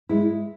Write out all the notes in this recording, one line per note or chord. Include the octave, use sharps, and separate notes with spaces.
G#3 E4